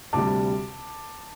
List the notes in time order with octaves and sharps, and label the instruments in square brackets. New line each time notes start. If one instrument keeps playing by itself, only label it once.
[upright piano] D2 C3 G3 A5 D6